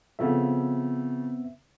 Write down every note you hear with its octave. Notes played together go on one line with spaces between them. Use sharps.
C#3 F3 B3 C4 A4 E5